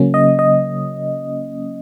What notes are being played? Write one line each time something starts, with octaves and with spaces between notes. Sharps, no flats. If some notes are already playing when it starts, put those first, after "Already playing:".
Already playing: C#3 F#3 A#3 C#4
D#5
D#5